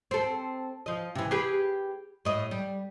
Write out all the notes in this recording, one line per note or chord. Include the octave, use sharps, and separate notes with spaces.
C4 A4
F3 D#5
C3 E3
G4 G#4 B4
A2 D#5
G3